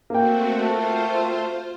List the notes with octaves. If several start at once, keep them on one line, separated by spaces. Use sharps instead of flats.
A3 A#3 C4 F#4 G5
A3 F4 C5